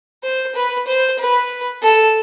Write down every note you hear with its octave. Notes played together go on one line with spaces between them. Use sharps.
C5
B4
C5
B4
A4